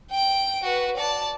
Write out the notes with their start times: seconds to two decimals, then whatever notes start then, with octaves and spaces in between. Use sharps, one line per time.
0.11 G5 D7
0.63 F#4 B4
0.97 D5 A5